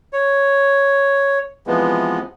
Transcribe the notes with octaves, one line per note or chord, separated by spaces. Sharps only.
C#5
C3 E3 F3 G#3 B3